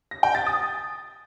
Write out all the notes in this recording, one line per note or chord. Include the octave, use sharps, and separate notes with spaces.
A#6
G5
A6
D#6